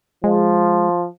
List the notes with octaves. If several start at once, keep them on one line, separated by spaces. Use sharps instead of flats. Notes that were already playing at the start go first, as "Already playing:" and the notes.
F3 G#3